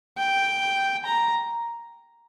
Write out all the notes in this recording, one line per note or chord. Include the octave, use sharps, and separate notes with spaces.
G5
A#5